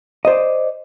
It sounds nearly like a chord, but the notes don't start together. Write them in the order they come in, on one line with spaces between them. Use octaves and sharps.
D#5 C5 D5